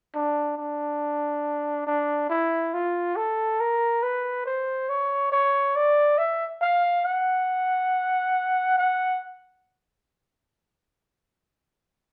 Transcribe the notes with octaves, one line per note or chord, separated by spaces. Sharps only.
D4
D4
D4
E4
F4
A4
A#4
B4
C5
C#5
C#5
D5
E5
F5
F#5
F#5